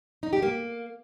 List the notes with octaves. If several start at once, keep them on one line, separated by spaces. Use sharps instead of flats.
D#4
G4
A#3